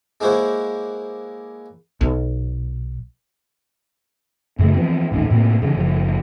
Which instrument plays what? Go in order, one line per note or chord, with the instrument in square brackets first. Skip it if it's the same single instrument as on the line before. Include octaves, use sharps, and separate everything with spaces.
[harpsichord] G#3 A#3 E4 C5 C#5 F#5
[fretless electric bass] B1
[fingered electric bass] F#2 C#3 A3
E3 F3 B3 C4
D#1 A1 D#3 C#4
A2 C3 A#3
C#3 E3 C4 C#4
F#1 C#3 F3